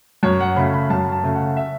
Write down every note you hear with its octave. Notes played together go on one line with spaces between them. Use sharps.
F#2 C#5
F#5
C#3 A3 B5
B5
F#2 A5
A5
C#3 A3
F#5
E5